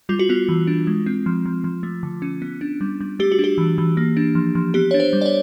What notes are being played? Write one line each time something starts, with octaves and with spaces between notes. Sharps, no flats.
G3 F4
F#4
B3 F4
E3
D4
G#3
C4
F3
F3
F3
A3
D3
C#4
B3
D4
G3
G3
A3 G4
F#4
D4 G4
E3
E3
A#3
D4
F3
F3
B3 G4
D4 C#5
C5
G3
D5
C#5